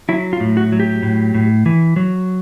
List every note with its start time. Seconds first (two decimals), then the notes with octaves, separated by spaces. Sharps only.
0.09 F#3 E4
0.33 F4
0.40 A2
0.57 F#4
0.72 F#3
0.80 G4
1.03 A2
1.34 A2
1.66 E3
1.96 F#3